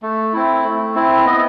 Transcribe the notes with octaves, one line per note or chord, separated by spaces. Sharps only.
A3
C4 E4
A3
C4 E4
B3 D#5